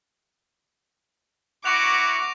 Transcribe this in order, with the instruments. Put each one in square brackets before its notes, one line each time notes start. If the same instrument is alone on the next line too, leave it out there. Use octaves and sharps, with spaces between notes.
[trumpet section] E4 F#4 [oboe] F#5 [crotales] C#6 A#6 F7 [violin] D6